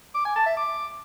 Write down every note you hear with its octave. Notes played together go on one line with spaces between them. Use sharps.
D6
G#5
A5
E5
D6